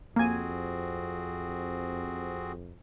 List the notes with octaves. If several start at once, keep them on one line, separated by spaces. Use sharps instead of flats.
F2 A#3 C4 F#4 G#4 G#5